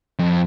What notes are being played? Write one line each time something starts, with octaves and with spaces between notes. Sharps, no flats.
F2